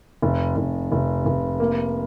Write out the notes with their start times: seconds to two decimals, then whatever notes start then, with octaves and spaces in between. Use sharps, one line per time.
0.22 F1
0.56 F1
0.92 F1
1.26 F1
1.60 A#3